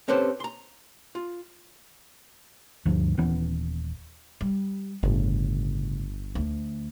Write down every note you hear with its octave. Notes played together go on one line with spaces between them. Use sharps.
C4 C#4 G4 A4 B4 C5
A#5 C6
F4
D2 G2 F3
D#1 E3 B3 C#4
G3
G1 A2 C#3
D2